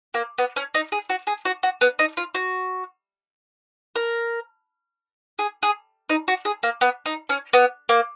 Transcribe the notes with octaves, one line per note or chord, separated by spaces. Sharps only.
A#3
B3
C#4
D#4
G#4
F#4
G#4
F#4
F#4
B3
D#4
F4
F#4
A#4
G#4
G#4
D#4
F#4
G#4
A#3
B3
D#4
C#4
B3
A#3